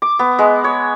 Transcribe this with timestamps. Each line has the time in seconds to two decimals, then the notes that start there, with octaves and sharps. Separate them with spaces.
0.02 D6
0.19 B3
0.39 G#3
0.64 C#5